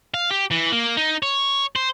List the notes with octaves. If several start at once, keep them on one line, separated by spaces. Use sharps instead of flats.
F5
G4
E3
A#3
D#4
C#5
C5